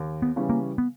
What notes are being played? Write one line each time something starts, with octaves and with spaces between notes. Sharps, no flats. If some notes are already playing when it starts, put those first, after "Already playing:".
Already playing: D#2
B3
C#3 E3 G3 C#4
A#3
B3